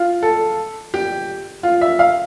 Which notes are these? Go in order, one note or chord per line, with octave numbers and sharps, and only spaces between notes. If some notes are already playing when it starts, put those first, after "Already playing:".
Already playing: F4
A4
G4
F4
E5
F5